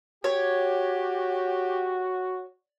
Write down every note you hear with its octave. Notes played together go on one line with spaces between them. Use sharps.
F#4 G4 C#5